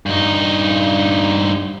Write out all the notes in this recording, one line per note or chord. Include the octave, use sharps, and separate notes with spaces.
G2 D#4